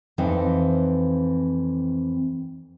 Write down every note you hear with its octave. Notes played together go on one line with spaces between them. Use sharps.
F2 E3 C4 D#4 F5